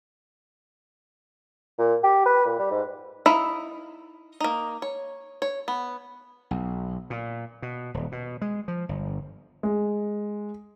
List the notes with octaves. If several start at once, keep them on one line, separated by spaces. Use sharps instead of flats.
A#2
G4
B4
A#2
G3
G#2
D#4 E4 E5 F5
A#3 D#4
C#5
C#5
B3
B1
A#2
B2
D#1
B2
G#3
F3
G1
G#3